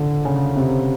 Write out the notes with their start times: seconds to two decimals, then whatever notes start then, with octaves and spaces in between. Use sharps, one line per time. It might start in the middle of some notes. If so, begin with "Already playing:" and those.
Already playing: D3
0.25 C#3
0.56 C3